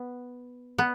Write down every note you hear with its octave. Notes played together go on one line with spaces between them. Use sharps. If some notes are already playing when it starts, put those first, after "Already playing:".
Already playing: B3
B3